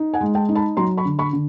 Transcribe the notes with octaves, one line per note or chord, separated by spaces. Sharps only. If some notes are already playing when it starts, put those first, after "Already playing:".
Already playing: D#4
F#5 G#5
G#3
G5 A5
D#4
A5 B5
F#3 A#5 C6
B5 C#6
D3
B5 C#6
D3